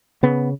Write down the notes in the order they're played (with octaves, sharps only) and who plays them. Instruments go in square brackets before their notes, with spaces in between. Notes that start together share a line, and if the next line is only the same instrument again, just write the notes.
[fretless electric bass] C#3 B3